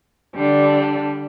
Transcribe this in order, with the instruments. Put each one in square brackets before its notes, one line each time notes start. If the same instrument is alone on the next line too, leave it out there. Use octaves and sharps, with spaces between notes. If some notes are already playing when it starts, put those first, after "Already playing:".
[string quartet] D3 G3 D4